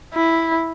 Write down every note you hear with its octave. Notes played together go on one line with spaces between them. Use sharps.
E4